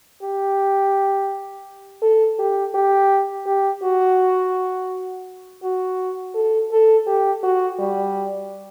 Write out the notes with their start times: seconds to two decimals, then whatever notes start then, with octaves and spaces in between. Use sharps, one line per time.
0.23 G4
2.02 A4
2.39 G4
2.75 G4
3.46 G4
3.83 F#4
5.63 F#4
6.35 A4
6.72 A4
7.07 G4
7.43 F#4
7.79 G3